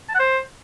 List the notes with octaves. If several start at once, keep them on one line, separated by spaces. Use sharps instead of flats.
A5
F#5
C5